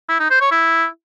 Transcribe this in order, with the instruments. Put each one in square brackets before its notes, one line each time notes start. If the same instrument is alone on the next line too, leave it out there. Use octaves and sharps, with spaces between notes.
[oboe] E4
D#4
C5
C#5
E4